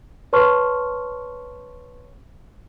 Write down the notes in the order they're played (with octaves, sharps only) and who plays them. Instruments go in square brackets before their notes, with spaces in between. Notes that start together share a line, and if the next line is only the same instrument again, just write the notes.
[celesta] B4 C#5 A5 C6 C#6 F6